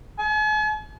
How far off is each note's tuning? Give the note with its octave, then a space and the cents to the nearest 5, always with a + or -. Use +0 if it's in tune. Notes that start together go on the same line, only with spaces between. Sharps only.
G#5 +45